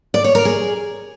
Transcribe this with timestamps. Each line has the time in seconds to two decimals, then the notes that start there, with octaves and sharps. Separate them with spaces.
0.14 D5
0.24 C#5
0.35 A#4
0.45 G#4